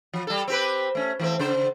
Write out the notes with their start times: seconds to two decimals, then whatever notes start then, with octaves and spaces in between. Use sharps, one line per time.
0.14 F3
0.27 G3 A4
0.48 C4 G4 B4
0.95 A3 C#4
1.20 E3 A3 C4
1.39 C#3 C5